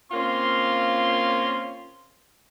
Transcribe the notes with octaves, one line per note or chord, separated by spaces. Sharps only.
A#3 C4 C#4 F4 F5 C6